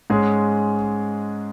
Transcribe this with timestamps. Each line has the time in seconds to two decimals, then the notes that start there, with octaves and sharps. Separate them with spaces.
0.10 G#2 G#3 C#4 G#4